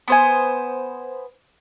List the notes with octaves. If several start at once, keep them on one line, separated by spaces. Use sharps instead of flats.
B3 C5 G#5